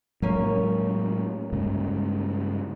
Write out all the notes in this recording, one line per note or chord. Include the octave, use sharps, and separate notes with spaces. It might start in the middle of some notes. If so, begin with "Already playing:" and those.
A2 F#3 G#3 A#3 C#4
G2 C#3 G#3